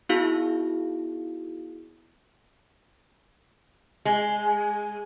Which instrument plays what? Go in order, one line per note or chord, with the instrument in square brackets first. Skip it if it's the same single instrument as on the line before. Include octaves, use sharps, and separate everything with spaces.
[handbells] B3 D#4 E4 F#4 G#4 F5
[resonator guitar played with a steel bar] G#3